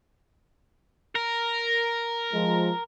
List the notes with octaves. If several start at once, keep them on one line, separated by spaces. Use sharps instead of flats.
A#4
F3 G#3